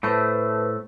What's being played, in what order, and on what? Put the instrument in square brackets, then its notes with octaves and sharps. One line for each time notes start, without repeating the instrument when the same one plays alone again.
[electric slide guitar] A2 A3 [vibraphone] B4 C5